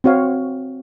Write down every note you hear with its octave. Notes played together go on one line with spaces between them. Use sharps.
C4 F#4 C#5 F5